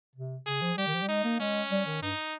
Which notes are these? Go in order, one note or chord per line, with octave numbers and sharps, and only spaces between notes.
C3
C#3 G#4
F3
G3 G4
D#3
F3
G3
G#3 D#4
A#3
G#3 C#4
G3
D#3
G2 D#4